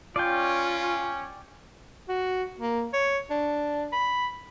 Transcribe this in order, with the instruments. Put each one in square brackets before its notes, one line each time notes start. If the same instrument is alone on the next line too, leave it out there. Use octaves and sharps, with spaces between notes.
[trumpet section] C#4 [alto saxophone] F4 [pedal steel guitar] D5 G5
[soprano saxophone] F#4
A#3
C#5
D4
B5